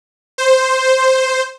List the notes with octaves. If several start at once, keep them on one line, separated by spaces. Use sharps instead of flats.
C5